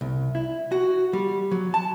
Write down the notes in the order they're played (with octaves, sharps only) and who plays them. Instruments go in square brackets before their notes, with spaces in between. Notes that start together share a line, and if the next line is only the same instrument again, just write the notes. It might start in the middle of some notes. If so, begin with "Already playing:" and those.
[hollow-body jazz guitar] C2
E4
F#4
G3
F#3
A5